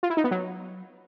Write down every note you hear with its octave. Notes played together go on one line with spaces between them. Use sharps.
F4
E4
D#4
B3
F#3